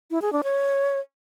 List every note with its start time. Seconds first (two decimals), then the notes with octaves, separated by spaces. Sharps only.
0.11 E4
0.22 G#4
0.33 D4
0.44 C#5